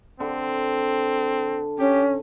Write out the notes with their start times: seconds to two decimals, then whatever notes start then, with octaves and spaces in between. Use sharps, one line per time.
0.20 D3 C4
1.79 C#4 G4